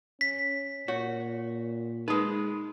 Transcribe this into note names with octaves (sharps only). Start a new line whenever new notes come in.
C#4 B6
A#2 F#4 C#5
G#3 D#4 B4 D#6